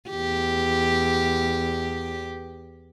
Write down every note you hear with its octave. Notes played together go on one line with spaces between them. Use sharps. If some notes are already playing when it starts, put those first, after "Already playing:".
E2 G4